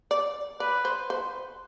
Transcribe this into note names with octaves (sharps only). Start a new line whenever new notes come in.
D5
B4 D5
C5
C5